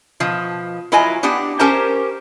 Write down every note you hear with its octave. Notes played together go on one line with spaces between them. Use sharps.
B2 F3
F#3 E4 F4 D#5 G#5 A#5
B3 D4 G4 F#5
C#4 G4 A#4 C5 A5 A#5